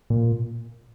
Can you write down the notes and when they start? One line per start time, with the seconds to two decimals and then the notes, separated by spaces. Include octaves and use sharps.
0.10 A#2